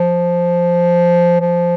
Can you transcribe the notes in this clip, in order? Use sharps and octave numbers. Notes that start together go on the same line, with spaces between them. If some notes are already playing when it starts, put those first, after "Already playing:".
Already playing: F3
F3